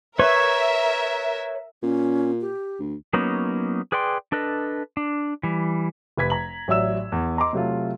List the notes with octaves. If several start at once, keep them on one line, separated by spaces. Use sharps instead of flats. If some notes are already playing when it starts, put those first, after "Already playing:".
A#4 B4 C#5 E5 C#6
A#2 C#4
G4
D2
F#3 A#3 B3 C#4 D#4
G#4 B4 D5 G5 C6
D4 A4 B4 D#5
D4
E3 G3
F1 B4 G#6 B6
A#5 F#7
A1 F#3 D5 E5 E6 E7
E2
D#5 A#5 C6 D6
C3 F#3 A3 F4